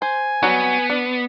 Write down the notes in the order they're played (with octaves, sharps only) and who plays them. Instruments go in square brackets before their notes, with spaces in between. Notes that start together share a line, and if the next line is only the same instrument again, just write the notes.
[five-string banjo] C5 [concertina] G#5
[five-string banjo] F#3 G3 F#4 [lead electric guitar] B3
[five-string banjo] D4